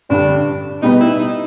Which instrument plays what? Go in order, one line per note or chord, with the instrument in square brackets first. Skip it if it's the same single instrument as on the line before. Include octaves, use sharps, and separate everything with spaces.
[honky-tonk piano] G2 D3 G3 [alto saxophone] D4
[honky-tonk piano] B2 G3 B3 [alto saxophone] D#4
[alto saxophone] E4
D#4